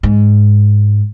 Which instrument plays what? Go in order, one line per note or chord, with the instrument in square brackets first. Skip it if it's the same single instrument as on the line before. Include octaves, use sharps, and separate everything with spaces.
[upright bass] G#2